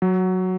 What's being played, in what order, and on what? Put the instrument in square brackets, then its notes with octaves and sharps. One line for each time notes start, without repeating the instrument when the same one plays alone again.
[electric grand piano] F#3